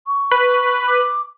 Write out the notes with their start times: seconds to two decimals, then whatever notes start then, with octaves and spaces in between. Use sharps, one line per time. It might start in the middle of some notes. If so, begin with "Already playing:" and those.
0.07 C#6
0.31 B4
0.87 D6